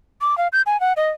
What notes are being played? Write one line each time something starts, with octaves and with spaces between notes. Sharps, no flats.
D6
F5
G6
G#5
F#5
D#5